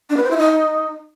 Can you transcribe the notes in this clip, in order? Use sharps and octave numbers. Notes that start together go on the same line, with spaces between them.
D4
B4
C5
E4
D#4